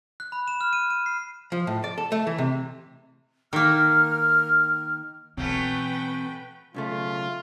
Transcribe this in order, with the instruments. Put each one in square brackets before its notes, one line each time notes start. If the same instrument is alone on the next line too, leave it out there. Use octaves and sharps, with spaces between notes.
[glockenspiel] F#6
B5
E7
F6
D#7
D#7
C7
[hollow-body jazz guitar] F3
A2
D5
A4
A3
E3
C3
[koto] D#3 A#3 [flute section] F6
[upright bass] B2 E3 [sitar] F#3 A3 C#4 [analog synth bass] C4 [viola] B4 G5
[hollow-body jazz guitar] B1 C#3 A3 [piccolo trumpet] F4